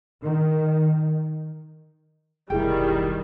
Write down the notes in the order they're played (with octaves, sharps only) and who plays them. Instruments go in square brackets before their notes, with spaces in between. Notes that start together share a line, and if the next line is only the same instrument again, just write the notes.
[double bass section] D#3
[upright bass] F1 B1 [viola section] D#3 G3 [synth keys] E4 G#4 G5